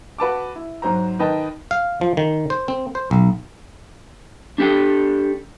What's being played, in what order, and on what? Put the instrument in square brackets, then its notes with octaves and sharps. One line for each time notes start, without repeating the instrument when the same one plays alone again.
[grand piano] F#4 B4 A5 D6
E4
G#2 F#3 C5 A#5
D#3 B4 D#5 G5 A5
[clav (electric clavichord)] F5
F3
D#3
C5
C4
C5
B1
[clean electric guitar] D4 G4 A4 G5